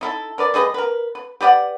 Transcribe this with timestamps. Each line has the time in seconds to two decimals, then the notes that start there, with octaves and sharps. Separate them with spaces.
0.01 D#4 E4 A4
0.38 A#4 B4 D5
0.54 G3 G#4 B4 D#5
0.74 A#4 B4
1.15 B4
1.41 G4 B4 D5 F#5